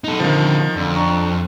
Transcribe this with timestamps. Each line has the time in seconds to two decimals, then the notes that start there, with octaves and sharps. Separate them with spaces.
0.04 D#4 A4
0.20 D3 D#3 F3 C4
0.76 F2 D3
0.96 D4 A#5 C#6